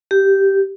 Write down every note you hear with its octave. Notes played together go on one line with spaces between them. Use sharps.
G4